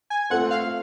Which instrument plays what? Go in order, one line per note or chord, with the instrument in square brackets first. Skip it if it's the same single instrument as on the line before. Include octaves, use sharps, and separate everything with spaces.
[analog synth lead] G#5
[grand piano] A3 C4 F4 A4 C5 [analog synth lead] F#5
[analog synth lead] F5